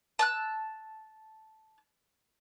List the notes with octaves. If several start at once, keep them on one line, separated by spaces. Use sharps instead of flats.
A5 E6 F#6